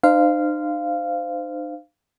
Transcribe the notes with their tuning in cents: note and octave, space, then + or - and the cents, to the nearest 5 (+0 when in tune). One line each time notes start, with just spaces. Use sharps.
D#4 -45 C5 -20 F5 -10